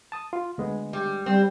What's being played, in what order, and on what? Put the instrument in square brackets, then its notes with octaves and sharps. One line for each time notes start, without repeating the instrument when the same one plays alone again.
[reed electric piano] A5 D#6
F4
D2 G#3 B3
[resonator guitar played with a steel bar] G3
[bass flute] G3 [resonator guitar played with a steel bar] C4